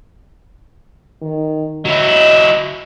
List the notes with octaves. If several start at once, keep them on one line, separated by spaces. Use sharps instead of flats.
D#3
F#3 E4 D#5